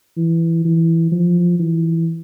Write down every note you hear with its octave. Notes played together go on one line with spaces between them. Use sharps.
E3
E3
F3
E3